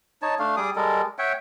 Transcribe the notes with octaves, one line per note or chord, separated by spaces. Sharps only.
D#4 C#5 A5
A3 D4 F5
G3 G#4 D6 D#6
G3 G#3 A4 A#4
C#5 E5 F#5 G5